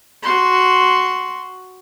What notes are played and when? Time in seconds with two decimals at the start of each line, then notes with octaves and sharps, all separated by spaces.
0.23 F#4 C6